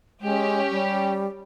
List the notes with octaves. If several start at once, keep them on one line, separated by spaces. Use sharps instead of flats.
G#3 C#4 G4
G3